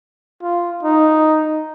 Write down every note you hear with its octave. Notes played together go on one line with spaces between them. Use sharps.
F4
D#4